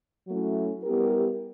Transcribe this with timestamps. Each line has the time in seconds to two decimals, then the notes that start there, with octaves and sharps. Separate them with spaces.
0.28 F#3 A3 C#4 E4
0.83 G3 B3 E4 G4 A#4